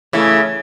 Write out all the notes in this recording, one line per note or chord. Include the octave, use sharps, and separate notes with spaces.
C#3 E3 A3 E4